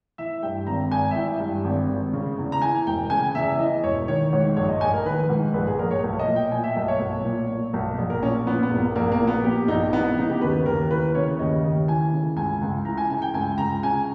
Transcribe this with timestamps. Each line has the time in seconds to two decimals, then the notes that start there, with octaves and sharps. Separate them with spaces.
0.18 E3 E5
0.42 G2 G5
0.67 G#1 A#5
0.91 G#1 G#5
1.11 E5
1.15 E3 G5
1.40 G2
1.64 G#1
1.89 G#1
2.13 C#3
2.38 E2
2.52 A#5
2.62 E3 G#5
2.86 E1 G5
3.10 C#3 G#5
3.35 E2 E5
3.59 E3 D#5
3.83 E1 C#5
4.08 D#3 C#5
4.33 G#2 C#5
4.56 A#1 C#5
4.69 D#5
4.81 A#1 G#5
4.93 A#4
5.05 D#3 B4
5.29 G#2
5.54 A#1 B4
5.67 G#4
5.79 A#1 A#4
5.91 C#5
6.04 B1
6.19 D#5
6.27 A#2
6.36 G5
6.51 A#2 G#5
6.64 E5
6.76 B1 D#5
6.88 C#5
7.00 B1
7.25 A#2
7.49 A#2
7.73 B1
7.98 A#1
8.10 A#4
8.22 A#2 C#4
8.47 A#2 B3
8.63 B3
8.71 A#1
8.80 A#3
8.96 A#1 A#3
9.12 A#3
9.20 A#2
9.27 B3
9.44 A#2 G4
9.68 A#1 D#4
9.93 E3 B3
10.04 B3
10.17 C#3 D#4
10.30 G4
10.41 D#2 B4
10.66 D#2 A#4
10.90 E3 B4
11.15 C#3 C#5
11.39 D#2 D#5
11.63 D#2
11.88 E3 G#5
12.13 C#3
12.36 C#2 G#5
12.61 C#2
12.85 E3 A#5
12.97 G#5
13.09 C#3 G#5
13.22 G5
13.33 C#2 G#5
13.58 C#2 A#5
13.83 C#3 G#5